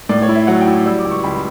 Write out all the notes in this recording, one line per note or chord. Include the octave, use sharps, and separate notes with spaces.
A2 D5
C#5
E4
E5
F#3 F#5
G5
E4
G3 E6
D6
C#2
C#6
C#2 B5